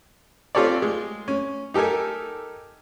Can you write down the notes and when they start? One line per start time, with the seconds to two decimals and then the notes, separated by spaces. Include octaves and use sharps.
0.55 C4 F4 G4 A4 C#5 D5
0.82 G#3
1.28 C#4
1.74 D#4 G4 A4 A#4 G#5